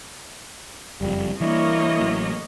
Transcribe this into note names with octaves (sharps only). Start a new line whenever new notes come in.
F#1 F2 G3
E3 G3 A#3 D4 E4 C#5 D#5
A1 F#3